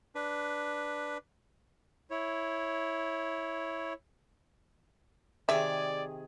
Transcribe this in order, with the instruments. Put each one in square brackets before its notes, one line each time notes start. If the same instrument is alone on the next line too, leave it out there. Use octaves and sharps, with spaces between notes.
[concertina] D4 B4
[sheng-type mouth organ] E4 C#5
[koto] C3 D#3 G#4 [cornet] D5 [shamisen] E5